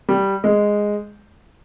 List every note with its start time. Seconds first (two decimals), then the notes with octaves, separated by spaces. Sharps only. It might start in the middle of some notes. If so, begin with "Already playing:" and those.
0.09 G3
0.44 G#3